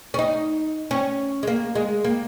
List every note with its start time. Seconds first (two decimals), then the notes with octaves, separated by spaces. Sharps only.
0.14 C#4
0.19 D#4
0.91 C#4
1.43 G#3
1.47 A#3
1.75 G#3
2.04 A#3